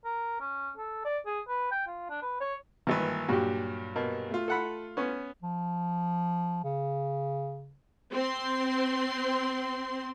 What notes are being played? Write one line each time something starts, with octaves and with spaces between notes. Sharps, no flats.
A#4
C#4
A4
D5
G#4
B4
G5
F4
D4
B4
C#5
G#1 G2 E3 A#3 B4
G2 A#2 F#3 F#4 G4
B2 A#3
A3 F4
A4 F#5 B5
B3 C#4
F3
C#3
C4 C6